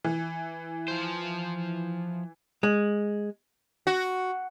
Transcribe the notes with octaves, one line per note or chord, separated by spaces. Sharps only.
E3
F3 C5
G#3
F#4